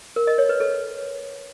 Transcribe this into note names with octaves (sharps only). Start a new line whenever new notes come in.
A#4
D#5
C#5
B4
A4